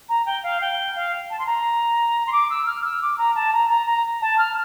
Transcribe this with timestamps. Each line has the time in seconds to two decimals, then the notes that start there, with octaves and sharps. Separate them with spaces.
0.09 A#5
0.26 G5
0.43 F5
0.61 G5
0.96 F5
1.30 A5
1.39 C6
1.46 A#5
2.27 C6
2.32 D6
2.50 E6
2.66 F6
2.85 E6
3.01 D6
3.18 A#5
3.35 A5
3.53 A#5
3.69 A#5
3.86 A#5
4.22 A5
4.38 F6